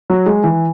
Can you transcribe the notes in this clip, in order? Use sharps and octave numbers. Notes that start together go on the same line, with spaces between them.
F#3
G#3
E3